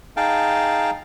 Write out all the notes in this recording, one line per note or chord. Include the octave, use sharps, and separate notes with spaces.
D#4 G#4 F5 G5 A5